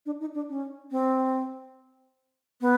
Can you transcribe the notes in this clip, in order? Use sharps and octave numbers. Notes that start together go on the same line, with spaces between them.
D4
D#4
D4
C#4
C4
B3